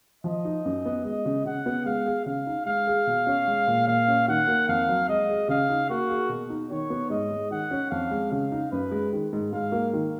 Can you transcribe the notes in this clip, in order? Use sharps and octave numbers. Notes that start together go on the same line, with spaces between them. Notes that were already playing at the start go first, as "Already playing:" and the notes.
F3 D#5
D#4
F#2
B3
G#3 D#5
C#3
C#3 F#5
B3
G#3 F5
G#4
C#3 F5
D#4
G#3 F5
G#4
B2
C#4
G#3
A#2
A#2 F5
C#4
D#3 F#5
A#3
F2 F5
F#3
G#3 D#5
G#4
C#3 F5
D#4
A#3 F#4
G#4
B2
D#4
D#3 C#5
B3
G#2 D#5
G#3
D#3 F#5
C#4
F2 F5
G#3
C#3 F5
D#4
F#2 B4
G#3
D#3
G#2
G#2 F5
A#3
D#3